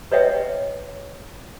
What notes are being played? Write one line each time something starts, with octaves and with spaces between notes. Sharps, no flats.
B4 C#5 D#5 E5 F#5 G5